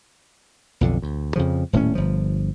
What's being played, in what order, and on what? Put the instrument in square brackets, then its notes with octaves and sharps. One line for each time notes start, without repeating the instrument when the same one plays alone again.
[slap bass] B1 F2 D3
D2
F2 C#3 F3
D#1 A2 A#3 C#4
G1 F3